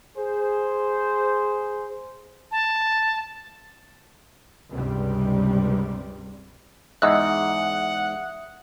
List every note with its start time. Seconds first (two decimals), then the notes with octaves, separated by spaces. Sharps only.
0.17 G#4 C5
2.51 A5
4.72 C#2 G2 C3 G3
7.02 E2 G#2 D#5 E5 F#5 D#6 E6 F#6